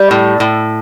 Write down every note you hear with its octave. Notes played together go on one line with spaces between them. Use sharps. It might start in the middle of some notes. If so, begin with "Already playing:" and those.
Already playing: G3
A2
A2